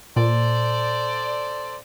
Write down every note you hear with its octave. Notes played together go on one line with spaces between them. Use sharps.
A#2 A4 C5 D5